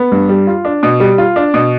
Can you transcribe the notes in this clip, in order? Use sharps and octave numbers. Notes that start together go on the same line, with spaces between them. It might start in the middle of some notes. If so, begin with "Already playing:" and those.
Already playing: B3
G2
G3
F4
D4
B2
G3
F4
D4
B2